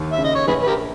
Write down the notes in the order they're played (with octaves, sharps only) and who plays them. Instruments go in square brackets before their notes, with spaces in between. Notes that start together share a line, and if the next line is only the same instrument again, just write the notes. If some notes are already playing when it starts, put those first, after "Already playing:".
Already playing: [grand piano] D#2
[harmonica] E5
[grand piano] C#3
[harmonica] D#5
C#5
[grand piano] A#1 [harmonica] G#4 B4
[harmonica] B4
G4 A#4